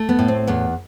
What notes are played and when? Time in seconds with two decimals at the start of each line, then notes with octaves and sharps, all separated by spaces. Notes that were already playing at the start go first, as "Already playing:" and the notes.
Already playing: A3
0.09 B3
0.19 A2
0.28 C4
0.47 E2 B3